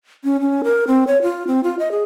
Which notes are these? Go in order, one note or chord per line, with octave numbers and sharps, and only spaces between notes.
C#4
C#4
A#4
C4
C#5
F4
C4
F4
D#5
G#4